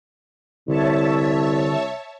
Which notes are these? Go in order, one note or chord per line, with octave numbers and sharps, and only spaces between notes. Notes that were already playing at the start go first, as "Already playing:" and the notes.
C2 D3 C#5 E5 A5